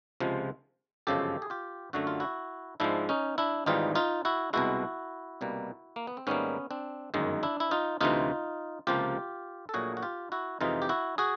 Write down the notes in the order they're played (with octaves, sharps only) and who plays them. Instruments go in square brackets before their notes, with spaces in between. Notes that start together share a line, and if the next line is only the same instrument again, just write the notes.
[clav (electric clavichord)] C#2 C3 F3 G#3
G1 F#2 C#3 F3 G#3 G4 A4
G#4
F4 G4
F#2 D3 F#3 A3 F#4
F4
E4 F#4
G#2 F3 G#3 D4 E4
C#4 D#4
D4 E4
G#1 G#2 E3 G3 D#4 F4
D#4 F4
E4 F#4
C2 B2 G#3 E4 F#4
C2 B2 G3 A#3
A#3
B3
C4
G#2 D#3 G3 A#3 B3 C#4
C4 D4
G1 F#2 D#3 G#3
D4 E4
E4
D#4 F4
D2 C3 E3 D#4 F4
C#2 C3 F3 A#3 F4 G4
A4
A#1 A#2 F#3 A3 F#4 G#4
F#4
F4 G4
E4 F#4
F2 C3 E3 G#3 D#4 F4
G4
E4 F#4
F#4 G#4